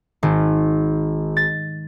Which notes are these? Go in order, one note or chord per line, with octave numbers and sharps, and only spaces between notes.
G#1
A6